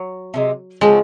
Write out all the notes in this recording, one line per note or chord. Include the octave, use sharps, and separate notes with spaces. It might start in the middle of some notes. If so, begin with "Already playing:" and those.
Already playing: F#3
C3 D#3 G#3
C#3 F3 G#3 C4 F#4